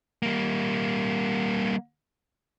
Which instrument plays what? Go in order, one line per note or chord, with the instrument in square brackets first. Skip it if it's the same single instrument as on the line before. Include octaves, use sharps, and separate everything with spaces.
[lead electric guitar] G3 A#3